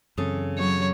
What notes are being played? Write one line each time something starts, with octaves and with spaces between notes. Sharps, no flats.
F#2 C#3 E3 C4 A4
F#3 C#5